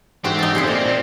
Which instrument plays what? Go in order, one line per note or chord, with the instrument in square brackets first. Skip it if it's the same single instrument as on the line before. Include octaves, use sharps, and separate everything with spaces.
[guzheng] G#2 E3 F#4 [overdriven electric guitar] C4 [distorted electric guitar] G4
[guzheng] D#4 A4
[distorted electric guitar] F2 C#3 [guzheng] G#4 C5 E5
[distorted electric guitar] A#3 F4 [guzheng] D5
[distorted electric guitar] A#2